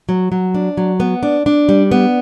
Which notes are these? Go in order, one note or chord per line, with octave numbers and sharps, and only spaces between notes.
F#3
F#3
D4
F#3
B3
D4
D4
G3
B3